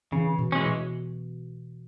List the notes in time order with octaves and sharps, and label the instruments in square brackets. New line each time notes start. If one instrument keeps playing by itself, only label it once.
[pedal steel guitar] C#3 [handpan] E3
[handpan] B2
[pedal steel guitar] E3 G#3 C#4
[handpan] B2